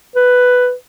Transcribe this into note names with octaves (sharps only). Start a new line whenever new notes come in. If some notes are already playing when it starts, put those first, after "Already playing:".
B4